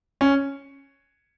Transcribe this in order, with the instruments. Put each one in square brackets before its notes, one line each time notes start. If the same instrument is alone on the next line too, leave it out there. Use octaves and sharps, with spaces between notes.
[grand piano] C#4